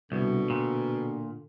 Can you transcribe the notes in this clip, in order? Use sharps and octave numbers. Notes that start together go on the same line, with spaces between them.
C2 B2 D3
A#2